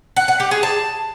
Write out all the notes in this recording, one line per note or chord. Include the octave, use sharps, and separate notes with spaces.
F#5
F#5
G4
G#4
A5